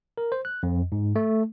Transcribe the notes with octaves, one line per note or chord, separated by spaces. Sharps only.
A#4
C5
F#6
F2
G#2
A3